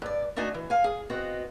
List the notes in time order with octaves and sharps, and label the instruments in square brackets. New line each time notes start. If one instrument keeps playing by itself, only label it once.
[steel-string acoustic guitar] G2 D5
A3 D4 D#4 F#4 G#5
E3
F5 G#5
G#4
B3 C4 F#4 D#5